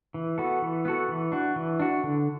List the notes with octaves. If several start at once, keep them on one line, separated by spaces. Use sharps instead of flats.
E3
B3 F#4 A4
E3
B3 F#4 A4
E3
D4 F#4
E3
D4 F#4
D3